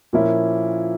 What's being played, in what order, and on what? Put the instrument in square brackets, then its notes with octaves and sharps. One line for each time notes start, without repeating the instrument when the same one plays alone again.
[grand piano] A#2 F3 A#3 C#4 E4